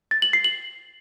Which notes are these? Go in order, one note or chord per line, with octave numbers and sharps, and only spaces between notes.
A6
F#7
C7
F#7